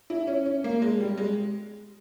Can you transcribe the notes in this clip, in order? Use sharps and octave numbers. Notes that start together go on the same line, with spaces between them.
E4
C#4
C#4
A#3
G#3
G3
G#3